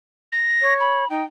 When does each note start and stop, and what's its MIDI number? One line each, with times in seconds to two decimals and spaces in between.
0.32 0.74 94
0.62 1.04 73
0.80 1.07 83
1.10 1.22 63
1.10 1.25 79